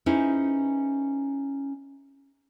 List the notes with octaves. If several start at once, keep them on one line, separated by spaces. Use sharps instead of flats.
C#4 D#4 E4 G#4 B4 C5